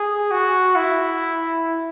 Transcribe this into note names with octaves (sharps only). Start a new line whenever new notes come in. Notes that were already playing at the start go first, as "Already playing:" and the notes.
Already playing: G#4
F#4
E4